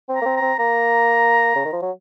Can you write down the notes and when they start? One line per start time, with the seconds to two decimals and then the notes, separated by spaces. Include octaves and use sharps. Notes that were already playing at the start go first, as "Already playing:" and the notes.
0.09 C4
0.15 A#5
0.22 A#3
0.26 C4
0.36 A#5
0.42 C4
0.59 A#3 A#5
1.55 C#3
1.65 D#3
1.73 F3
1.82 F#3